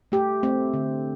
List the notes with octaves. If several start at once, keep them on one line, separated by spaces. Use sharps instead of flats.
A3 G4
A3 C4
D3